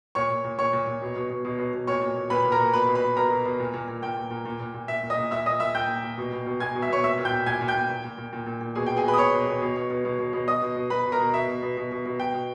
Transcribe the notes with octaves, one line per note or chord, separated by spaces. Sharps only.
A#2 C#5 C#6
A#2
A#2
A#2 C#5 C#6
A#2
A#2
B2
B2
B2
B2
B2
B2
A#2 C#5 C#6
A#2
A#2
A#2 B4 B5
A#2
A#4 A#5
A#2
B2 B4 B5
B2
B4 B5
B2
B2 A#4 A#5
B2
B2
A#2
A#2
A#2
A#2 G5
A#2
A#2
A#2
A#2
A#2
A#2 E5
A#2
D#5 D#6
A#2
A#2 E5 E6
A#2 D#5 D#6
A#2 E5 E6
A#2 G5 G6
A#2
A#2
B2
B2
B2
B2 G#5 G#6
B2
E5 E6
B2 C#5 C#6
A#2 E5 E6
A#2
G5 G6
A#2
A#2 G#5 G#6
A#2
G5 G6
A#2
A#2
A#2
A#2
A#2
A#2
A#2
B2 G#4 G#5
G5
B2
G#4 G#5
B2 B4 B5
D#6
B2 C#5 C#6
B2
B2
B2
B2
B2
B2
B2
B2
B2 D#5 D#6
B2
B2
B2 B4 B5
B2
A#4 A#5
B2
B2 E5
B2
B2
B2
B2
B2
B2 G5
B2